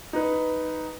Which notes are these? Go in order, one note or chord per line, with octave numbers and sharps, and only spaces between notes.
D#4 B4